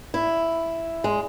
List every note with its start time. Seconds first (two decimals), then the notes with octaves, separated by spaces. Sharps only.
0.14 E4
1.04 G#3